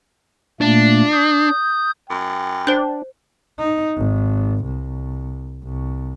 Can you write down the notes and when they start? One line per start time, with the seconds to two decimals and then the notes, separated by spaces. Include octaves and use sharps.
0.61 A#2 A3 A#3 D4
1.11 D#6 G6
2.10 F#2 G5
2.67 D4 C5 G6
3.59 D#4
3.97 G#1
4.65 C2
5.64 C2